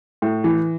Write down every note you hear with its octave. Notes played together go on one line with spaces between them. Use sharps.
A2
E3